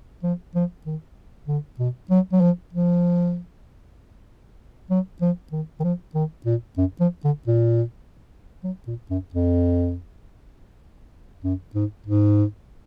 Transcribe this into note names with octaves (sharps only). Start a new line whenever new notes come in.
F3
F3
D#3
D3
B2
F#3
F#3
F3
F3
F#3
F3
D#3
D#3
F3
D#3
A#2
F#2
F3
D3
A#2
F#3
A#2
F#2
F2
F#2
G#2
G#2